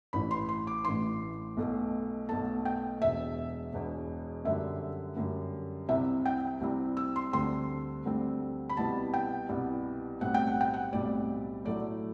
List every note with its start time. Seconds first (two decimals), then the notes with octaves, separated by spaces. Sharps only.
0.13 A1 A2 E3 B5
0.31 C6
0.49 C6
0.67 D6
0.84 A1 A2 E3 C6
1.57 B1 B2 A3
2.29 B1 B2 A3 A5
2.65 G5
3.01 E1 E2 B2 E5
3.73 E1 E2 B2
4.44 F#2 D3 G3 E5
5.17 F#2 D3 G3
5.89 C2 C3 G3 C4 E4 E5
6.26 G5
6.61 C2 C3 G3 C4 E4
6.97 E6
7.16 C6
7.33 D2 D3 G3 C4 C6
8.05 D2 D3 G3 C4
8.69 B5
8.77 C2 B2 G3 B3 E4 A5
9.14 G5
9.49 C2 B2 G3 B3 E4
10.21 B1 A2 G3 C4 F#5
10.34 G5
10.47 F#5
10.61 G5
10.74 F#5
10.93 B1 A2 G3 C4 D5
11.65 A2 F#3 A3 E4 D5